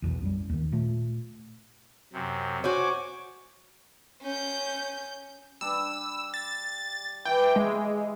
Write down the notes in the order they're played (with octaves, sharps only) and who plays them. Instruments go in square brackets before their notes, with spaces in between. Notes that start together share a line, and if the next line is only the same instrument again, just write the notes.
[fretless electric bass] B1 E2 B2
F#2 G3
D#2 D#3
A#2 A3
[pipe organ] F#2 C3
[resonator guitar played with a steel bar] F#4 C5 C#5 [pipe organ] G#5 D6
[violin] C#4 G6
[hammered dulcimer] G3 D4 [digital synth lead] E6
[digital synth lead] A6
[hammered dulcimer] E3 D6 [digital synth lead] G5
[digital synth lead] G#3